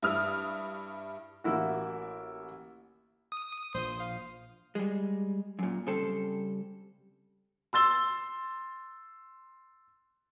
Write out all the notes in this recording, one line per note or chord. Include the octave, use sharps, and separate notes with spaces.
G2 E4 D#6 F6
A1 A#3 E4 F#4
D#6
A#1 F3 C5
F5
G3 G#3
F#2 A#2
C#3 G3 C4 A4
C6 E6 A6 G7